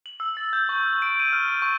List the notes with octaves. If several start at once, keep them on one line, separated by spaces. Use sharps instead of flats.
F#7
E6
A6
G6
C#6
F6
D7
D#7
F6
D7
C#6